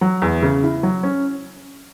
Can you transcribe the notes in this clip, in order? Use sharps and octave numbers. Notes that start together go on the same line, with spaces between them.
F#3
E2
C#3
E4
F#3
C#4